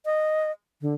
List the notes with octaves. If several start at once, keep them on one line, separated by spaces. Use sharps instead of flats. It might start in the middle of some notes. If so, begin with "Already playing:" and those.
D#5
D3